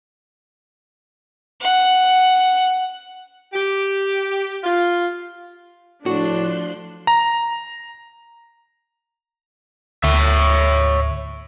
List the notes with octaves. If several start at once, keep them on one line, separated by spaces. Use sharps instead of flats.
F#5
G4
F4
A2 F3 D4 F#4 C6 F#6
A#5
D2 C#5 E5